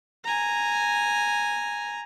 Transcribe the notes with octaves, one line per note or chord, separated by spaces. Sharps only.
G#5 A#5